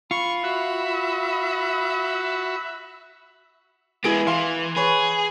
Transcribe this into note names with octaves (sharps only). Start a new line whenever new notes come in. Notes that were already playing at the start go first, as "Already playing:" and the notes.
F4 B5 C#6
F#4 E5
G#3 B3 E4 G#4 D7
E3 F5 C6
G#4 B4 C#5